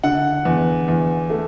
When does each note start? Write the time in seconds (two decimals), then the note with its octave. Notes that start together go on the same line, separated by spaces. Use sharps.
0.03 D3 F#5
0.45 E2
0.88 E2
1.30 A3